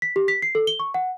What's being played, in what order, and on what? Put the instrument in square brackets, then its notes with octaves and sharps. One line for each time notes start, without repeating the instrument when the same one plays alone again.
[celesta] B6
G4
B6
C7
A4
G7
C#6
F#5